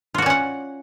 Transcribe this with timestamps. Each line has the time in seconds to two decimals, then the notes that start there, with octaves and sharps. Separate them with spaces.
0.14 F4
0.18 F#4
0.22 D5
0.26 C#4
0.30 F#5